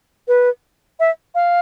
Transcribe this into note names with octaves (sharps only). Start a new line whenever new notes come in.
B4
E5
F5